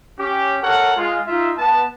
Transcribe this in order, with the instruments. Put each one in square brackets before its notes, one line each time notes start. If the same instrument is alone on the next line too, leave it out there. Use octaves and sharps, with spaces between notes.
[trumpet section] C#4 G4
A4 A#4 C#5 F#5
G#3 F4
D#4 F4 E5
B3 A5